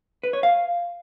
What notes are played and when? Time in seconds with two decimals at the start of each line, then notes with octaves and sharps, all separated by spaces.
0.23 B4
0.33 C#5
0.43 F5